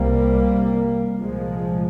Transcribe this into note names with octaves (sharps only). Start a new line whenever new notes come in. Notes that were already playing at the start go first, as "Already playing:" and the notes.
Already playing: C2 C3 G3 A#3
C2 A#2 F3 G#3